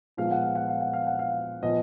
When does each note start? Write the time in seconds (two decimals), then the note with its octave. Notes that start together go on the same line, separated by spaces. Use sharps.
0.17 A#2 F3 G#3 B3 F5
0.31 F#5
0.43 F5
0.55 F#5
0.68 F5
0.81 F#5
0.93 F5
1.07 F#5
1.19 F5
1.63 A#2 F3 B3 D#5